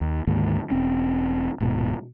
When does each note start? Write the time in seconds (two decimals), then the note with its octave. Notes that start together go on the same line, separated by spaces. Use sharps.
0.01 D#2
0.27 D2 G#2 D#3 A#3
0.70 E1 C4 C#4
1.60 D#1 G#2 B2